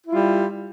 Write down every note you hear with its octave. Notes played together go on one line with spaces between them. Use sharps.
G3 E4 F4